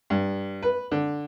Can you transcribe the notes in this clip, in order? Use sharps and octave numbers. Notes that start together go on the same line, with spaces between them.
G2
B4
D3